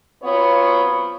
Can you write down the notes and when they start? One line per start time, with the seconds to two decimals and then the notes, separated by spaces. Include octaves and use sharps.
0.23 F#3 B3 C4 F4 C#5